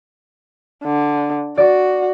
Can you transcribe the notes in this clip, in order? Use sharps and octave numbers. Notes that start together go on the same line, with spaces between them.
D3
F#4 D5 D6